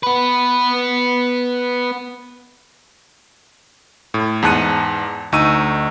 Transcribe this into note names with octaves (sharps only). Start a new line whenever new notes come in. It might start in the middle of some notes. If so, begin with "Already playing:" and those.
B3 B4
A2
E2 G#2 A5 F#6 C#7 D#7
D2 D#4 C#6 E6 D#7